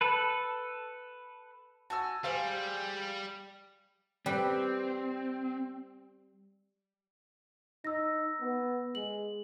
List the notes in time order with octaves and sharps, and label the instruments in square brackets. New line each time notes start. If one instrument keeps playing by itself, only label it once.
[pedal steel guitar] A4 B4
[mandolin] F#4 G#5 [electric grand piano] A5 E6
[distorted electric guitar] G3 [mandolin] G#4 C5 [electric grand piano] F5
[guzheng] G3 B4 [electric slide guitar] C4
[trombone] D#4 [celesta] E6 A#6
[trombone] B3
[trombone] G#3 [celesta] F#7